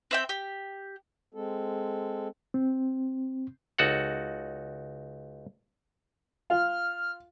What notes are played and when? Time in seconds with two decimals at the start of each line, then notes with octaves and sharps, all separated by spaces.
0.11 C4 E5 G5
0.29 G4
1.34 G#3 C4 A4
2.54 C4
3.78 C#2 D#4 F#4 A4 F#5
6.50 F4 F6